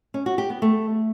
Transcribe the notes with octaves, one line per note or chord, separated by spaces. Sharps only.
C#4
F#4
G4
B3
A3